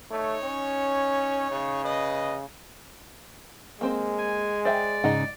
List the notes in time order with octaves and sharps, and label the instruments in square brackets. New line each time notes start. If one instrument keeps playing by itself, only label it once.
[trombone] A3 [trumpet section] D#4 C#5
[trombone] C#4
C#3
[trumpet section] B4 D#5
[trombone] G#3 [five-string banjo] A#3 C4 C5
[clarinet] G#5
[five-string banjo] C5 E5 G5 [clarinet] D5
[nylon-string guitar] G#2 C#3 D#4 [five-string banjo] D#5 F#5